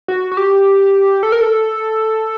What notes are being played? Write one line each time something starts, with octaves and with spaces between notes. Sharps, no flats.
F#4
F#4
G4
A4
A#4
A4